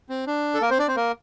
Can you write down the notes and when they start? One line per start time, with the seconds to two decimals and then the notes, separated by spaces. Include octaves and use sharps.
0.09 C4
0.27 D4
0.54 A4
0.62 A#3 A#4
0.70 C4 C5
0.79 D4 D5
0.88 C4 C5
0.96 A#3 A#4